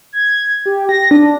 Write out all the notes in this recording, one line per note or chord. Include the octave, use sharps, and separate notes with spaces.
G#6
G4
A#6
D4